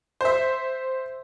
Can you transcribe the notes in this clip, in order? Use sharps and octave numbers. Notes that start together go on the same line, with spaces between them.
C5 E5